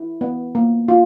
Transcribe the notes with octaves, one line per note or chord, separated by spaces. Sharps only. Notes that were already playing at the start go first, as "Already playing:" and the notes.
Already playing: E4
B3
A#3
F4